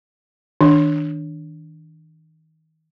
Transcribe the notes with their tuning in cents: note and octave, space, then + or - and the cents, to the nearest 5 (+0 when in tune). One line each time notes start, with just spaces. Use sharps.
D#3 +35 D4 +0